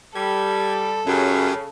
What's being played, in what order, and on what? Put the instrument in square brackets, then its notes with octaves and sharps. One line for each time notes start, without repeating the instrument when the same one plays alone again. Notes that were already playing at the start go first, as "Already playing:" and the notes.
[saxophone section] G3 [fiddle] A4 [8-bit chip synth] G#6
[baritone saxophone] F#2 [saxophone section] C#3 [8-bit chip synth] C#4 G4 G#4